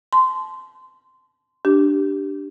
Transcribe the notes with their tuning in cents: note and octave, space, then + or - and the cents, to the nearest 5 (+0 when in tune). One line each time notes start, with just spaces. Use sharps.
A5 -30 C6 -15
D4 +0 G4 -10